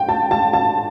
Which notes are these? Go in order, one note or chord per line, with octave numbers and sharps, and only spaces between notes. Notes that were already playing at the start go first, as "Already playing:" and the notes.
Already playing: G5
A5
A5
A5